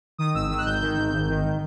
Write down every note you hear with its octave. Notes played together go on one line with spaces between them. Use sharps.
D#3 D#6
G#1 E6
D#3 E6
F#6
G#1 G6
D#3
G#1
G#1
D#3